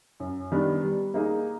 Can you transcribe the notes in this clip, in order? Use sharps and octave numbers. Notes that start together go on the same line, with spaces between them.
F#2
D#3 G3 B3 D4
G3
A#3 D#4 G#4